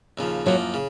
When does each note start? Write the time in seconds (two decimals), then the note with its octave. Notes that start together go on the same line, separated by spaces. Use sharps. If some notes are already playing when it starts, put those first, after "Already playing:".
0.18 D#2 C#3 F3
0.46 F#2 F3 F#3 A#3
0.74 C#3